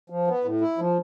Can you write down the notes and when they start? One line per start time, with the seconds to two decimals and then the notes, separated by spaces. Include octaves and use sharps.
0.10 F3
0.28 B3
0.44 A2
0.61 E4
0.78 F3